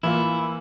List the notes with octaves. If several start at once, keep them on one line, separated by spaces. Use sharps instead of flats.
E3 A#3 E4 F4